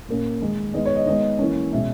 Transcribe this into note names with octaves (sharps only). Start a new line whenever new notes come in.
A#2 A#3 C#4
D#3 G#3 D#4
D#3 G#3 B3 D#5
C#5
D#5
D#3 G#3 B3 D#4 D#5
E3 A#3 C#4
B2 G#3 C#4 E5